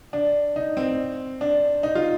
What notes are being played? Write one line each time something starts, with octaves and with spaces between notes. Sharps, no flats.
D4
D#4
C4
D4
D#4
F4